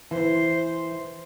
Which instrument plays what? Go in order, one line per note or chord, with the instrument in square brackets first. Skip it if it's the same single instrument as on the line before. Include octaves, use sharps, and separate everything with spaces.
[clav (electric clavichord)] E3 [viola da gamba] C5